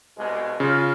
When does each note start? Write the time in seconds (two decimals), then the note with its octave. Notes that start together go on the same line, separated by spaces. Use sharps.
0.18 C2 B2 G#3
0.60 C#3 F4